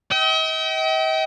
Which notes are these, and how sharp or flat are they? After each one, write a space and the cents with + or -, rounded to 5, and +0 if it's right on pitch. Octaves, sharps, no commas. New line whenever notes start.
D#5 +45 G5 -30